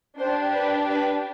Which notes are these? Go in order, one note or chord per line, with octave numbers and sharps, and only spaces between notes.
D4 G4 C5
B4
B4